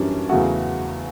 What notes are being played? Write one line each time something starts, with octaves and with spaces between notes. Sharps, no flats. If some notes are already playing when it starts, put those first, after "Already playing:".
Already playing: F#2 E3 G3 C#4 D4
E2 C#3 F#3 A3 F#4